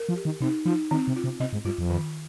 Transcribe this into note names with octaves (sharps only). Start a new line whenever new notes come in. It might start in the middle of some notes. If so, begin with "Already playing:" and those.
Already playing: A#4
F3
G4
D#3
C3 D#4
F3 D#4
D#3 C4
C3
F4
C3
C3 D#5
G#2
G2 F4
F2
D#3